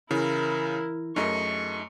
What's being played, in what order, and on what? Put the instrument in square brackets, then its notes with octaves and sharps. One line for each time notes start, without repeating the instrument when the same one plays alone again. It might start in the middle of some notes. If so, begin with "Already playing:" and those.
[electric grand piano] C#3 [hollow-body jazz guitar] E3 [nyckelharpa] E4 A#4
[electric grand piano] F#2 A3 D#5 [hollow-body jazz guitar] D#4 G#4 A#4 [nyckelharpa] C#6